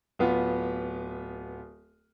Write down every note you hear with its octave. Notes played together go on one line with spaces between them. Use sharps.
D1 B3 F4